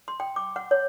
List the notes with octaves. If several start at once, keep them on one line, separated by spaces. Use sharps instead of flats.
C6
G5
D6
F#5
C#5